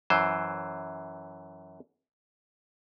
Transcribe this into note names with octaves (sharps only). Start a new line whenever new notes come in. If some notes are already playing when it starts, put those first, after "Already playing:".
F#2 E3 C5